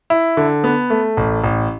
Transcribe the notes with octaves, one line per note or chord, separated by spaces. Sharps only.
E4
D3
B3
A3
A1
A1